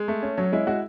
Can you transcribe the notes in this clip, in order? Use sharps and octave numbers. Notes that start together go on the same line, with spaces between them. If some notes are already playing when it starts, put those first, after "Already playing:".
Already playing: G#3
A3
C#4
F#3 C#4
G#3 E4
G#3 F#4